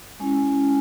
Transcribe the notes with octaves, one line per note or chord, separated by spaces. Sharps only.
G#3 C#4 E4 G#5
G#5